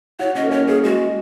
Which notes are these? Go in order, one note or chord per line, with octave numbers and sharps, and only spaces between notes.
F#4 C#5
C#4 D#5
A#3
C#4 C#5
A#3 G#4
G#3 F#4
G#3